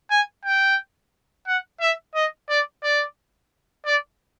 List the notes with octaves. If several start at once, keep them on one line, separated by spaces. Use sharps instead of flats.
G#5
G5
F#5
E5
D#5
D5
D5
D5